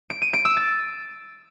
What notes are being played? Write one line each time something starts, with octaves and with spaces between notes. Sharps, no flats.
D7
D#7
D7
E6
A6